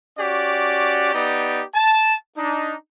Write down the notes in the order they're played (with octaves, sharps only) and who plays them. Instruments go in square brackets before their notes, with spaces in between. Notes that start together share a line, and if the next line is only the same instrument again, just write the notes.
[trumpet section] C#4 F#4 G4 D5
B3 D#4 G4 D5
A5
D4 D#4